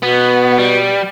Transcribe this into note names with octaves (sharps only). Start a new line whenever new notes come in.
B2 B3
G3